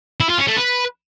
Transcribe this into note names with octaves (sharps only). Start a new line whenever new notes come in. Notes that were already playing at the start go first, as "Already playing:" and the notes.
E4
F4
C#4
A3
B4